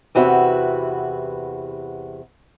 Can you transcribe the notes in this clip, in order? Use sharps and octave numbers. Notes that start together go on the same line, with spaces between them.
E2 C3 F#4 B4 E5